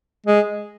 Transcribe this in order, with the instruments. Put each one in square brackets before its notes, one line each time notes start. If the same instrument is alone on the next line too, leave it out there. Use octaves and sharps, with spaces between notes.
[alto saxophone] G#3